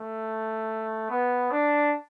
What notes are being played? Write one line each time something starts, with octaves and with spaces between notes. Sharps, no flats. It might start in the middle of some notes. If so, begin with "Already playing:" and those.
Already playing: A3
B3
D4